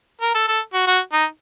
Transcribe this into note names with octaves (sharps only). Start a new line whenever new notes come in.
A#4
A4
A4
F#4
F#4
D#4